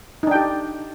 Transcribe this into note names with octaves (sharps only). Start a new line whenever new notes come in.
D4 D#4 G4 G5